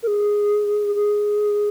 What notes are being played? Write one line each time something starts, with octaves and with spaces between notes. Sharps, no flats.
A#4
G#4
G#4